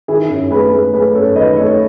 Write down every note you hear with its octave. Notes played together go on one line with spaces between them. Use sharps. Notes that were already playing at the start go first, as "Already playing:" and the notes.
D#3 E4 G#4
F#2
A3 G#4 B4
A3 G#4 B4
A3 G#4 B4
F#2 A4 C#5
D#3 B4 D#5
A3 A4 C#5